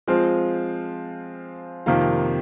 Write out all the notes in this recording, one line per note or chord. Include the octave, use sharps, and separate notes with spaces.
F3 G#3 C4 F4
F2 C3 D#3 A#3 F4